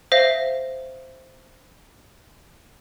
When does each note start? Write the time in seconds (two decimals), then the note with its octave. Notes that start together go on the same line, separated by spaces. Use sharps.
0.12 C5 E5 F5 A#6